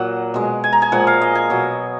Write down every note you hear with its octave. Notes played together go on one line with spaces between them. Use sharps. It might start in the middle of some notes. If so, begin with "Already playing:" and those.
Already playing: A#2 F#3 F#5
B2 G#3
G#5
A#5
G#5
A#2 F3 G#3 F#5
F5
D#5
G#5
B2 F#3